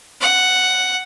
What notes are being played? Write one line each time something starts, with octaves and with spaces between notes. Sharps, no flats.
F#5